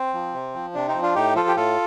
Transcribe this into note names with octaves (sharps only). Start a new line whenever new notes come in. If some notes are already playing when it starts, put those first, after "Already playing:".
Already playing: C4
F3
C3
F3
C3 D4
C4 D#4
F3
D4 F4
A2 D#4 G4
F3 F4 A4
G4
A2 F4 A4